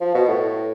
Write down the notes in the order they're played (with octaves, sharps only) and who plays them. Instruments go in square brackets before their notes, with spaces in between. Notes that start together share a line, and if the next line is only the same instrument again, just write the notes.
[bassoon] F3
B2
A2